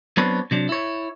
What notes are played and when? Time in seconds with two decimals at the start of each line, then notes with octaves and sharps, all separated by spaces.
0.17 F#3 B3 C4 D4 B4 C#5
0.51 C3 F#3 D4
0.69 E4 C#5